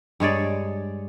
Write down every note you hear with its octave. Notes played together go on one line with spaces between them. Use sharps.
G2 G#3 C#5 D5